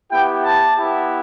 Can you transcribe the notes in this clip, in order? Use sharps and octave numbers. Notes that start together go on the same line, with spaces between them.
B3 E4 G4 G5
A5
B3 E4 G4